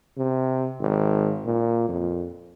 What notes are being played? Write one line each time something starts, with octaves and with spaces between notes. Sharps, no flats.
C3
G#1
A#2
F2